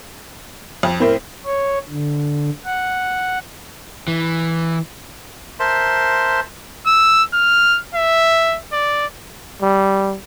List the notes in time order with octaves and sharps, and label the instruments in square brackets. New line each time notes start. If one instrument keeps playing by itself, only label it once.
[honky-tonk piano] F2
[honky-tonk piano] A2 C4 [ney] A#4
[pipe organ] C#5
D3
F#5
[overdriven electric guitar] E3
[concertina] A#4 C5 E5 A5 C6
[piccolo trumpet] E6
F6
E5
D5
[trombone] G3